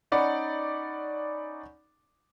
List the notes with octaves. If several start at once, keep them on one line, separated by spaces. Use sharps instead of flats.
C#4 D#4 D5 F#5 B5